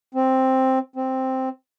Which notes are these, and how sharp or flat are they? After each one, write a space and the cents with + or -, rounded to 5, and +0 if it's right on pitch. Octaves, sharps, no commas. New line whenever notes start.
C4 +5
C4 +0